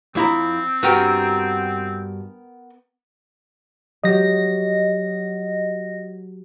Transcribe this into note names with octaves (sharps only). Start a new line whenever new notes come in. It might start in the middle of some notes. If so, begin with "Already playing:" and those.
F2 C4 E4 A#5
G2 B3 F#4 A#4 G5
F#3 G4 D#5 A#6